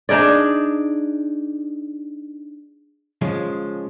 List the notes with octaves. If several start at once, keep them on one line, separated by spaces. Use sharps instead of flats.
D4 D#4 G#4 D5
C#3 F3 G#3